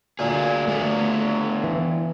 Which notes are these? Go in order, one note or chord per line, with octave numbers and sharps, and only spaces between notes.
D2 A#2 A3 G#4
A3 B3 D4
E3